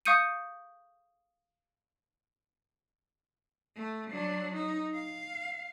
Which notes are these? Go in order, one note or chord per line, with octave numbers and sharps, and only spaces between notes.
F5 C#6 D#6 G6 C#7 D#7
A3
F#3 D4
D#4
F5